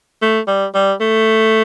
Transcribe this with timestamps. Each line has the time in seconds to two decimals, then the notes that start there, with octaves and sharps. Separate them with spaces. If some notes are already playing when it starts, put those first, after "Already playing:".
0.22 A3
0.47 G3
0.75 G3
1.01 A3